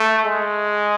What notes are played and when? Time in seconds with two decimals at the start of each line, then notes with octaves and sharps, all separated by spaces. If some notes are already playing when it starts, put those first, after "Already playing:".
Already playing: A3
0.25 G#3